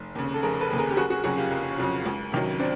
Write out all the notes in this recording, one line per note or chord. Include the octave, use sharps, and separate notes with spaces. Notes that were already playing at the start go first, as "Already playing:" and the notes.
Already playing: F1
D#2 C#3
A4
F1 G#4 A#4
A4 B4
D#2 C#3
G#4 A#4
G4
F#1 F#4 G#4
F#4 G#4
F2 C#3 F#3 F#4 G#4
F4 G4
F#1
F2 C#3 F#3
C#2
C3 D#3 F#3
C4 D4